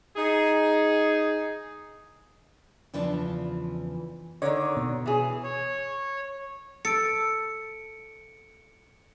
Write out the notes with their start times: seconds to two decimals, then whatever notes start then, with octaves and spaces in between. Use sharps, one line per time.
0.16 D#4 G#4
2.94 E2 C#3 E3 F3 D4
4.42 D3 D#3 C#5 D5 D6
4.76 B2
5.06 E3 G#4
5.43 C#5
6.85 A4 C#7 D7